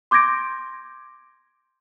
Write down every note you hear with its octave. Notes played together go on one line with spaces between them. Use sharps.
C6 D6 G6 G#6 A#6 D7